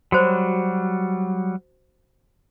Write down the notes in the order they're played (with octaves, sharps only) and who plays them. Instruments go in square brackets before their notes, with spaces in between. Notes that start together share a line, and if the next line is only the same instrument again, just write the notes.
[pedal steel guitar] F#3 G3 [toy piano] F#4 C5